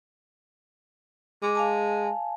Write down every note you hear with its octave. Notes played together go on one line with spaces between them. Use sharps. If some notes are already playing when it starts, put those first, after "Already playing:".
G#3 D6
F5 G#5 A5